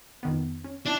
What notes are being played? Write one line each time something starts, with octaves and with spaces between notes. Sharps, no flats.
F2 D#3 B3
C#4
D4 E4